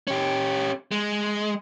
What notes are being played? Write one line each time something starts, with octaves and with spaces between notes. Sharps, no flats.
C#4 G4
G#3